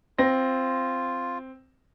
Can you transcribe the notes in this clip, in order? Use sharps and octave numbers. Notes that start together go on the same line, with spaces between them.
C4 F4 A#6